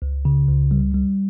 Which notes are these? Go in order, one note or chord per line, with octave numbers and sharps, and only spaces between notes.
C#2
C#3
C#2
G3
G3